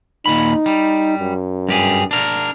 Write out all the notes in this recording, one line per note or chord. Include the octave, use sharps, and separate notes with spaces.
D#2 A#2 D#4 B5
G3
F#2
G2 G4 G#4
D4 A#4